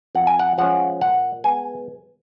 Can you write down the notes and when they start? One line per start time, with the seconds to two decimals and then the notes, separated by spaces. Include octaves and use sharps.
0.15 F2 F#5
0.27 G#5
0.39 F#5
0.58 F3 G#3 C#4 F#5
1.01 A#2 F#5
1.44 G#3 B3 G#5